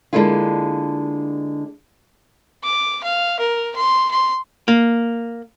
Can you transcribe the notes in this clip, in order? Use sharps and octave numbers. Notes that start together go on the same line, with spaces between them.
D3 G#3 A#3 D4 E4 F4
D6
F5
A#4
C6
C6
A#3